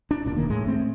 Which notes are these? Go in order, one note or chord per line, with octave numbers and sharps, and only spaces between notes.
D4
D#1 A#2 D4
E1 D2 D#3 A#3
A2 G#3
A3 C4